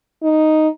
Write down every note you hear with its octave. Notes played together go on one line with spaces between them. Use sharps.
D#4